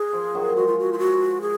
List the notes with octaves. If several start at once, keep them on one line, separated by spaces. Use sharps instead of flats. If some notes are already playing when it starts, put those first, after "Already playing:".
Already playing: G#4
F3
D#3 F#3
F#3
F3 G#3 F#4
F4
F#4
F4
F#4
G#4